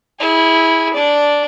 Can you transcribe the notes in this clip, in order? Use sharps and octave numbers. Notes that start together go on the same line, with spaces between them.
E4 G#4
D4 D5